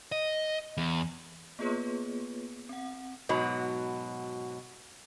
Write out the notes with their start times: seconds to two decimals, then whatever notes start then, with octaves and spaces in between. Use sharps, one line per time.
0.12 D#5
0.77 E2
1.59 A#3 B3 F4 G#4 B4 C#5
2.69 C4 F#5
3.29 G#2 B2 F#3